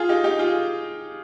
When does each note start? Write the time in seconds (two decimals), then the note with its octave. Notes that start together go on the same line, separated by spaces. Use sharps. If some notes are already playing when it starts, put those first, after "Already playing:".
Already playing: F4 G#4
0.09 D#4 G4
0.24 D#4 G4
0.39 F4 G#4